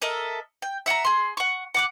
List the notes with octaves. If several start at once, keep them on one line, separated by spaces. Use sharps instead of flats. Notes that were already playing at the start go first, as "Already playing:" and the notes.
A4 A#4 D#5 E5
G5
E5 F#5 G#5 A#5
G#4 C6
F#5 C#6
F#5 D6 F#6